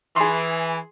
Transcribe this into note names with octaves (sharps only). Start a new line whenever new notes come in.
E3 G#4 C6